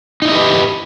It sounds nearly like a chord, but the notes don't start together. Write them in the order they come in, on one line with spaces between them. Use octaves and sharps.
D#4 E4 D#5 G4 B4